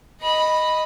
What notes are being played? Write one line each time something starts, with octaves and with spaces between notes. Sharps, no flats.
D#5 B5